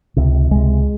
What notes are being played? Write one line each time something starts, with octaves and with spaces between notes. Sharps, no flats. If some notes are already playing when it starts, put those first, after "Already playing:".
C#2 C3
C#2 C3 G#3